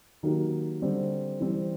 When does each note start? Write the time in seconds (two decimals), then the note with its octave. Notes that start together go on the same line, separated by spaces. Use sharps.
0.23 D#3 F#3 A#3 D#4 G4
0.82 D3 G3 C4
1.40 E3 G3 C4